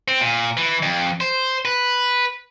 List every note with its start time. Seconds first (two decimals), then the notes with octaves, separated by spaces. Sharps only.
0.08 C4
0.21 A#2
0.57 E3
0.82 F2
1.21 C5
1.65 B4